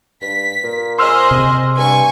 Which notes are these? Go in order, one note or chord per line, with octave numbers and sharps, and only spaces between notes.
G2 B6
A#2
G#4 C5 D#5 C6 E6 F6
C3
G2 G#5 C#6